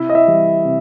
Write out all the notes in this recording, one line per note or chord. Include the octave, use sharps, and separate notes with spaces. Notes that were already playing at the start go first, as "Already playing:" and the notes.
Already playing: C3 E4 E5
D#5
E4 E5
E3 G3
C3